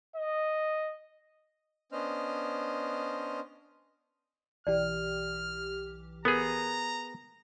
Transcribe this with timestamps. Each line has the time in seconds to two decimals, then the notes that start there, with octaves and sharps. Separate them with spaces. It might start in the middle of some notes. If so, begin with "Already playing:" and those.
0.16 D#5
1.92 B3 C#4 D4 C5 D#5 F6
4.67 B1 E3 G4 D5 F6
6.25 B3 G#4 A#4 A#5